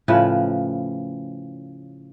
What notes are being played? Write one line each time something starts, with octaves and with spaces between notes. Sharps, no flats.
A2 C#3 F3 B4